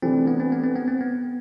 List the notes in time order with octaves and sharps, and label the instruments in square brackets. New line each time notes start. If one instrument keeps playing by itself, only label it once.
[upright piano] C3 E3 A3 D4 [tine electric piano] C4
[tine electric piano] B3
C4
B3
C4
B3
C4
B3